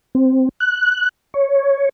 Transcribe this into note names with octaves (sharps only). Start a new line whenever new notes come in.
C4
F#6
C#5